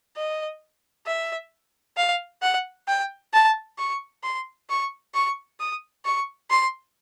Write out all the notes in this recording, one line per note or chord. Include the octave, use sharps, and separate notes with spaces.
D#5
E5
F5
F#5
G5
A5
C#6
C6
C#6
C#6
D#6
C#6
C6